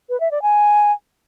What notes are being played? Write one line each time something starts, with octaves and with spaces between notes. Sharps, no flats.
B4
E5
D5
G#5